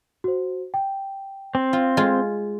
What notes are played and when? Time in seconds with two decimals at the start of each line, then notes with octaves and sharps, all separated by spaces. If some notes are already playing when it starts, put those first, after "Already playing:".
0.24 F#4 C5
0.74 G5
1.55 C4
1.73 F4
1.97 G#3 F4